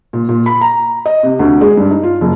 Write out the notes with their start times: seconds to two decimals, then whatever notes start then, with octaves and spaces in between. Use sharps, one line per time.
0.13 A#2
0.29 A#2
0.46 B5
0.61 A#5
1.06 D#5
1.23 C3
1.39 D2
1.61 G#3
1.77 G2
1.91 D#4
2.03 F4
2.21 F#1